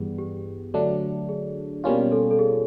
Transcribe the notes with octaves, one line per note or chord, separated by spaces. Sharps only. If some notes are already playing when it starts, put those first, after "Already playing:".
Already playing: G2 E3 G3 B3 G#4
G4
D3 F#3 A3 D4
G#4
B2 G3 A#3 C#4 F4
A4
A4
G#4